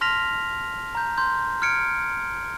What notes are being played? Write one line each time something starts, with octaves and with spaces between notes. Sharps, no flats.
A5 C6 F6 A#6 B6 F7
A#5 G6
C6 G6
F6 G#6 C#7 D7